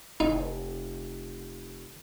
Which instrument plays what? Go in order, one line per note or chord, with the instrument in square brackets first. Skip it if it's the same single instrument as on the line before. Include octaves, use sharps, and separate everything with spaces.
[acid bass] F1 [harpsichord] D#4